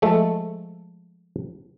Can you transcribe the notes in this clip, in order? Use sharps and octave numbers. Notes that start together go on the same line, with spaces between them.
F3 G#3 A3 A4